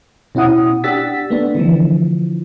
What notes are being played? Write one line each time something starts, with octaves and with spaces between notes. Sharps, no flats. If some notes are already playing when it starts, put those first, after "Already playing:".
B2 C#4 E4 F#5 D#6
D4 G4 F#5 E6 A6 B6
A3 B3 D4
D3 E3 F3